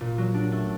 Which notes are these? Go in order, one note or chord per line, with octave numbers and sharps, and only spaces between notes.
A#2
F#3
D4
A3